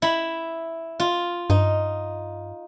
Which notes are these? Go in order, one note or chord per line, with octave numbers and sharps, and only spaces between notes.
E4 B5
F4
G2 D#4